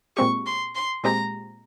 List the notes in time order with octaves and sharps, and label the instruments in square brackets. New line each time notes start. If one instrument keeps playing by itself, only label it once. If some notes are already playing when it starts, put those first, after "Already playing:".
[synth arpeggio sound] A#2 G#3 C4 G4 [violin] C#6
[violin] C6
C6
[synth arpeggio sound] A#2 G#3 C4 G4 [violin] A#5